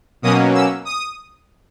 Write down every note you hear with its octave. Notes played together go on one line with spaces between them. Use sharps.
B2 F#3 A#3 C#4 D#6
E6
D#6